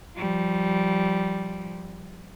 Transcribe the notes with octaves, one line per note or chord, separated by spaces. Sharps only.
F3 G3